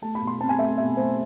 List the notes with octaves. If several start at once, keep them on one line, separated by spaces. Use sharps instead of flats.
A3 A5
B5
B2
C6
C4 A5
G#5
A3 E5
B2 E5
A3 C5